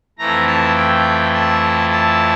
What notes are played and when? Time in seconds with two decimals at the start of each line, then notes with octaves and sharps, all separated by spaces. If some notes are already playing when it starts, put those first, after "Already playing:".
0.19 F2 E3 A3 A#5
0.47 A5
0.76 G5
1.34 A5
1.92 A5